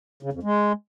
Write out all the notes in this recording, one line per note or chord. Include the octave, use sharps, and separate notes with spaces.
C#3
F2
G#3